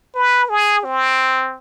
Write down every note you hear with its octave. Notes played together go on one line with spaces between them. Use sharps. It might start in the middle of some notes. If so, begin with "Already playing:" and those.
B4
G#4
C4